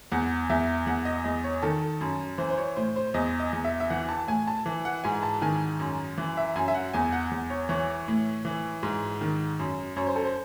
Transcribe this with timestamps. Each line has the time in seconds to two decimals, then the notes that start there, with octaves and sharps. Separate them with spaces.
0.12 E2 F#5
0.50 E2 E5
0.86 E2 F#5
1.05 D#5
1.24 E2 D#5
1.44 C#5
1.62 D#3 A4
2.01 F#2
2.38 E3 C5
2.50 C5
2.58 C#5
2.76 A2 C5
2.96 C5
3.14 E2 D#5
3.40 D#5
3.53 E2
3.64 E5
3.80 E5
3.90 E3 F#5
4.09 A5
4.28 A2 G#5
4.47 A5
4.66 E3
4.85 F#5
5.04 G#2 G#5
5.23 A5
5.42 D#3 G#5
5.80 F#2
6.18 E3
6.37 E5
6.56 F#2 G#5
6.68 E5
6.75 F#5
6.94 E2 G#5
7.12 F#5
7.31 E2
7.50 C#5
7.69 E3 C#5
8.08 A2
8.45 E3
8.83 G#2
9.21 D#3
9.59 F#2
9.96 F#2 C#5
10.07 C5
10.16 A4
10.24 C5